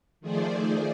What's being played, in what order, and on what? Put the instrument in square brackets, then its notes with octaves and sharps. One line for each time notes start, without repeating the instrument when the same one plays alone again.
[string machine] D#3 F3 A3 G#4 C5 D5